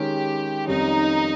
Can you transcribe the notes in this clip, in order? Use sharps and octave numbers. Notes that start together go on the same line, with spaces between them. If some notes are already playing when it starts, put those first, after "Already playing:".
Already playing: D#3 G#3 C#4 G4
F2 D#3 G3 C#4 D#4